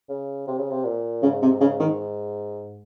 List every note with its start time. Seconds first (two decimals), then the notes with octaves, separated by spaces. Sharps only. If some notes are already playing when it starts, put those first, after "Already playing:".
0.09 C#3
0.47 C3
0.58 C#3
0.70 C3
0.85 A#2
1.23 G#2 C#3
1.42 C3
1.61 C#3
1.80 D#3